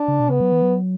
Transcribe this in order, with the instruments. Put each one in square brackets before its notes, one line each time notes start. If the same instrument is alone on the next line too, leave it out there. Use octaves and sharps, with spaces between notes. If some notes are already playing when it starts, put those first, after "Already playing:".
Already playing: [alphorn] D4
[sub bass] C#3
B2
[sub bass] C#3 [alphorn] B3
[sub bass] F#3
E3
F#3